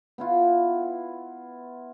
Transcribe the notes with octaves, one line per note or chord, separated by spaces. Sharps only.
B3 E4 F4